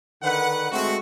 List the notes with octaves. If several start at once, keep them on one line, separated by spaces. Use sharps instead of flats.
D3 D#3 B4 F#5
G#3 A3 C4 F#4